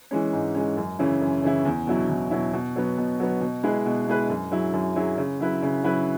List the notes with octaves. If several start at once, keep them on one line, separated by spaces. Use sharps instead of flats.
E3 G#3 C#4
G#2
E3 G#3 C#4
F#2
C#3 E3 C#4 E4
F#2
C#3 E3 C#4 E4
E2
B2 F#3 E4
E2
B2 F#3 E4
B2
F#3 B3
B2
F#3 B3
B2
G#3 E4 G#4 B4
B2
G#3 E4 G#4 B4
F#2
F#3 E4 G#4
F#2
F#3 E4 G#4
C#3
F#3 E4 B4
C#3
F#3 E4 B4